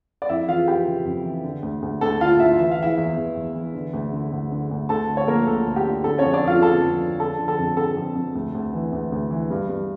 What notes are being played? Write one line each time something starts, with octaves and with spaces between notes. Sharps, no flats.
D5
F2 E4 E5
E3 F4 F5
F2 G4 G5
C#3
F2
E3
D3
D2
D2
D2 A4 A5
D3 F4 F5
D2 E4 E5
E3 E5
F5
E3 E4 E5
E2
E2
E2
E3
D3
D2
D3
D2
D3
D2
D2 A4 A5
D3
C#5
F3 A#3 A#4
D2 A4
D2
G4
D3
D3 A4
C#4 C#5
F2
D4 D5
F2 F4 F5
D3 A4 A5
F2
D3
F3 A4 A5
D3
A4 A5
F2
D3 A4 A5
F2
F2
D2
D2
E3
D2
D2
E3
G2
G2